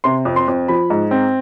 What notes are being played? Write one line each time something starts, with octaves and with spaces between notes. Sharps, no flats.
C3 C6
F2
C6
F2
F3 B5
G#2
C4